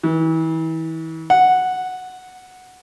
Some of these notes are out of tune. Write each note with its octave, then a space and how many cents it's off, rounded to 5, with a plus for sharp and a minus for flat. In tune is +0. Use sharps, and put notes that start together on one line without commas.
E3 -35
F#5 -5